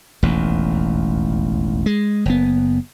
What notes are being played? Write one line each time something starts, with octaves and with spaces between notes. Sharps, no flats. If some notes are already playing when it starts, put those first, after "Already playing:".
E1 A1 D#2
G#3
F#1 B3